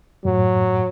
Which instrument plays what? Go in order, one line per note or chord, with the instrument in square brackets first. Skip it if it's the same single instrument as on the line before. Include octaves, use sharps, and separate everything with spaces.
[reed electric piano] F#2 A2 [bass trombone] F#3